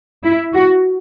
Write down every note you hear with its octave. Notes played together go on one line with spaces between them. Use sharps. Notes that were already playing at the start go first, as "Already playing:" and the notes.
E4
F#4